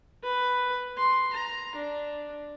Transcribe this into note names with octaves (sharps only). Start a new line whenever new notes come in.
B4
C6
A#5
D4